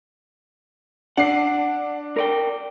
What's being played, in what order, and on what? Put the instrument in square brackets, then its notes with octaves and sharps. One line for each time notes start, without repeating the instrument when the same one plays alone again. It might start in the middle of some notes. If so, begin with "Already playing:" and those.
[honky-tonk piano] D4 C7 [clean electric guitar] D5 F#5
[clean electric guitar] A#4 D5 G5